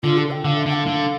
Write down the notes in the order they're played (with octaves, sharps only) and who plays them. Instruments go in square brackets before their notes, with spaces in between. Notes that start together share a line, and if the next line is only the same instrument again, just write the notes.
[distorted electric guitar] D3 [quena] F4
[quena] A4
G5
[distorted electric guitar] D3 [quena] F5
[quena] E5
[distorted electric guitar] D3 [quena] G5
[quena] F5
[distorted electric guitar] D3